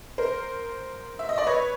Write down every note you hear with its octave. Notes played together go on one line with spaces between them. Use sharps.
A#4 C5
E5
D#5
D5
B4 C#5